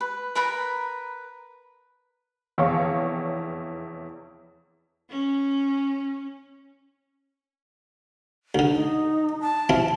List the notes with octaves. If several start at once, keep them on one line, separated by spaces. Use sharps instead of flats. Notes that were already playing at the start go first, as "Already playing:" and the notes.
B4
A#4 B4 A#5 B5
F1 E2 C#5 F5 C#6
C#4
D2 D3
D#4
A5
C4 E4 F4